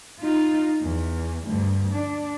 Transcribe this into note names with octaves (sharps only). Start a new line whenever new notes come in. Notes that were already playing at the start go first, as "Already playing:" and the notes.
D#4 F4
E2
D2 G2
D4